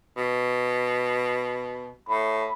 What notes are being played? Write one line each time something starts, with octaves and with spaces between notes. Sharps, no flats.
B2
A2 B5